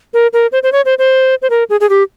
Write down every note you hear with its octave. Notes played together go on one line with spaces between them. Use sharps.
A#4
A#4
C5
C5
C#5
C5
C5
C5
A#4
G#4
G#4
G4